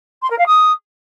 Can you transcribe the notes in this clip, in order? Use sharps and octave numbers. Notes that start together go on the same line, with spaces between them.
C6
A#4
F5
D#6